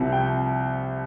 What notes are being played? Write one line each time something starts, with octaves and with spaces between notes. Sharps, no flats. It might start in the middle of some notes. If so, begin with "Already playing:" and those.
Already playing: C2 C3 F3
G5